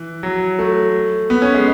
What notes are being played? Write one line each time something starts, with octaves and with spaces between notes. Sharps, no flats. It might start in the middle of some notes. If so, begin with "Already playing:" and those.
Already playing: E3
F#3
A3
B3
C#4
G#3